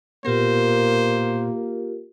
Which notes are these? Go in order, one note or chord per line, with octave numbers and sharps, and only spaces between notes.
A#2 A#3 B3 F4 G4 A#4 C5